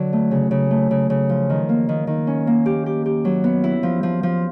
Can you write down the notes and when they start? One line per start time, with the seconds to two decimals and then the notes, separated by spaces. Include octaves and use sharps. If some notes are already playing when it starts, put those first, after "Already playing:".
Already playing: D3 F#3
0.13 A3
0.31 C#3
0.51 C#3
0.71 A3
0.91 C#3
1.10 C#3
1.29 F3
1.50 D#3
1.69 A#3
1.89 D#3
2.07 D#3
2.27 C#4
2.47 A#3
2.66 G4
2.86 G4
3.06 G4
3.25 F#3
3.44 B3
3.64 E4
3.83 F3
4.03 F3
4.23 F3